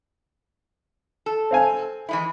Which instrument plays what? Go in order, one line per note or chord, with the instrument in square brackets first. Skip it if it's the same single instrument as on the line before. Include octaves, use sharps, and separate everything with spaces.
[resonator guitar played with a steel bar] A4
[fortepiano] C4 F5 G#5
[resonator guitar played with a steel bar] E3 G#3 E4